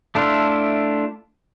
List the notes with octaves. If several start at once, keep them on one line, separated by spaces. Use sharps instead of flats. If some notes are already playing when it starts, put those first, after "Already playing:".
A3 D4 E4 F4 A4